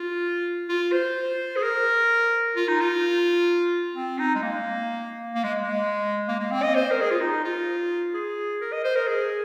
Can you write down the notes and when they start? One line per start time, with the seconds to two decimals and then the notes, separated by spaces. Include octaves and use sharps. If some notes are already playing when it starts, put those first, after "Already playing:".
Already playing: F4
0.69 F4
0.92 C5
1.57 G#4
1.63 A#4
2.56 F4
2.68 D#4
2.81 F4
3.95 C4
4.19 D#4
4.35 G#3
4.42 A#3
5.35 A#3
5.44 G#3
5.62 G#3
6.28 A#3
6.40 A#3
6.52 C4
6.63 D#5
6.75 C5
6.91 A#4
7.01 G#4
7.11 F4
7.21 D#4
7.45 F4
8.14 G#4
8.61 A#4
8.73 D#5
8.84 C5
8.96 A#4
9.07 G#4